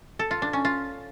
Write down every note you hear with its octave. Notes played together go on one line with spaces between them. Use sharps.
A4
F4
D4
C#4
F4